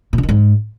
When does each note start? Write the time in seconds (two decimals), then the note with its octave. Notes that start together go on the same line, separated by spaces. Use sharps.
0.13 A#2
0.18 D3
0.23 D#3
0.29 G#2